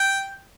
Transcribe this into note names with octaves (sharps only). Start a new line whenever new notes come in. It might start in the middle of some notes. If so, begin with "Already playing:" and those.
Already playing: G5